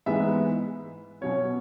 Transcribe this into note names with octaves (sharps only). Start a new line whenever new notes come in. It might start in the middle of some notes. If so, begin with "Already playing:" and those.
G#2 E3 G#3 B3 E5
B2 F#3 C#4 C#5